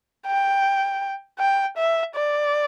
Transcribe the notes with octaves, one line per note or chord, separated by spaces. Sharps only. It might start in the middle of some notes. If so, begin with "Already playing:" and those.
G5
G5
E5
D5